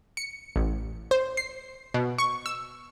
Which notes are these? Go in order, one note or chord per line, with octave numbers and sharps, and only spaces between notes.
C#7
A1
C5
C7
B2
C#6
E6